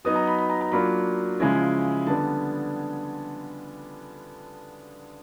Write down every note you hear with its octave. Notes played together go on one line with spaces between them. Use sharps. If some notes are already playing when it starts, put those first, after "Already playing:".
F#3 B3 D#4 D#6
A#5
B5
B5
A#5
A#5
F#3 A#3 D4 F4 B5
C#3 F3 G#3 C#4 E4
D3 G3 B3 D4 A5